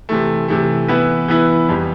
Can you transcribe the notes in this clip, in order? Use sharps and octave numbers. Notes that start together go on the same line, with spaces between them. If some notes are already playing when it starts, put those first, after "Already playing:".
C3 E3 A3
C3 E3 A3
E3 B3 E4 B4
E3 B3 E4 B4
F2 E3 G3